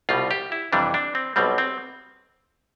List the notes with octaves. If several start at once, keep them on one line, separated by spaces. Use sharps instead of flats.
C2 B2 G3 F4
G4
E4
F2 C3 E3 G3 D4
D4
C4
B1 B2 G3 C4
C4